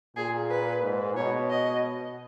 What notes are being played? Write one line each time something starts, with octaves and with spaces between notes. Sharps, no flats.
A#2 G#4
B4
G#2
B2 C#5
D#5